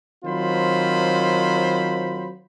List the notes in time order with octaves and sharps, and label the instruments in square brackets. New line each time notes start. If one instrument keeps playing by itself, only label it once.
[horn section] D#3 F#3 C4 F4 C5 B5